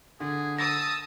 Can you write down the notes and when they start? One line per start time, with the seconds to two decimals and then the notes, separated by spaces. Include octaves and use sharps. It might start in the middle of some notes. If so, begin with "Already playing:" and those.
0.20 D3 G#4
0.59 A5 D#6 E6 A#6